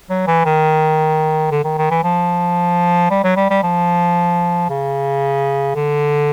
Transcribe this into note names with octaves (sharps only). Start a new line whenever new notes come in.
F#3
E3
D#3
D3
D#3
D#3
E3
F3
G3
F#3
G3
G3
F3
C#3
D3